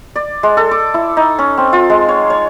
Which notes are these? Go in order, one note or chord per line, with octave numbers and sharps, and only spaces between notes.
D5
G#3
A4
D6
E4
D#4
C#4
C4
F4
G#3
C#5
C#5